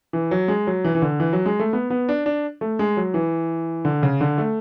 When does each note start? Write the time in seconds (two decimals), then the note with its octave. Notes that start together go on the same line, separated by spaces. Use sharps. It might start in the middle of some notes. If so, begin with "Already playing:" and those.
0.13 E3
0.31 F#3
0.48 G#3
0.67 F#3
0.84 E3
0.95 E3
1.02 D3
1.20 E3
1.33 F#3
1.46 G#3
1.59 A3
1.73 B3
1.90 B3
2.09 D4
2.26 D4
2.61 A3
2.79 G#3
2.97 F#3
3.14 E3
3.85 D3
4.03 C#3
4.21 D3
4.38 A3